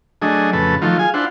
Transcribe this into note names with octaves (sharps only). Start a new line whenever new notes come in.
F#3 A3 D4 G#4 D#5
F2 A2 C#3 A4 B4
D#3 F3 F#3 A3 F4
G#4 F5 G#5
D4 E4 F4 C5 F#5